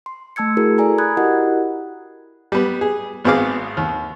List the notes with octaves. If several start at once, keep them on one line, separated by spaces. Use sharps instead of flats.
C6
A3 A5 E6 G#6 C#7
E4 F#4 G#4 A#4
A4 D5 G#5 A#5
B5 D#6 F#6 G#6
E4 F#4 G4 A#4 D#5 F#5
G3 B3
G#4
G#1 B3 C4 G#4 F5 D6
D#2